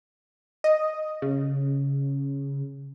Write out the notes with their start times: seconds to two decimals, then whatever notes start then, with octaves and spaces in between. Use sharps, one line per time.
0.64 D#5
1.22 C#3